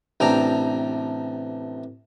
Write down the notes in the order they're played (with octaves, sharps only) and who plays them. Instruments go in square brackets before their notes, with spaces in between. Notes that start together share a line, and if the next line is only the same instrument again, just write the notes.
[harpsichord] A1 C3 D4 G5 A#5